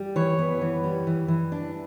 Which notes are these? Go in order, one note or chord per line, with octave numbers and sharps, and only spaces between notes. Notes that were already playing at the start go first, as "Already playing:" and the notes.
Already playing: G3
E3 C#5
B3
E3
G3
E3
E3
D4